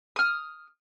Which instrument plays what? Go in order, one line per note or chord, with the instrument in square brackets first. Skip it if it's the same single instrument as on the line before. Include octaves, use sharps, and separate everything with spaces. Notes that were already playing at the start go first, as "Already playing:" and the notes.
[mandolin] D#6 F6